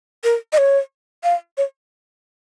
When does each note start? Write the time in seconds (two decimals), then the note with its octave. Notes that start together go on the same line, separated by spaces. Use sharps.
0.24 A#4
0.53 D#5
0.58 C#5
1.24 F5
1.57 C#5